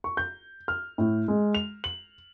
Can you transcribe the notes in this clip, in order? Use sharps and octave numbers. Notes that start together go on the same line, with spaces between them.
C#6
G6
F6
A2
G#3
F7
F#7